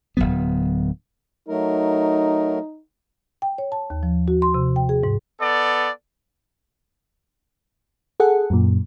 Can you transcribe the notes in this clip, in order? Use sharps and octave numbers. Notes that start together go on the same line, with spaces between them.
D1 G1 F#3 B3
F#3 A3 D#4 A#4
G5
C#5
A5
D#2
F3
F#4
C6
C3
G5
G#4
G#2
B3 A4 D5
G#4 A4 F#5
F#2 A#2